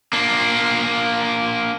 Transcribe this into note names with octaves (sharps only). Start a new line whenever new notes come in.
A#3 D4